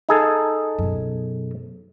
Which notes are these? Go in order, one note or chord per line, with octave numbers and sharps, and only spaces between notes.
D#4 G#4 A4
F#2 B2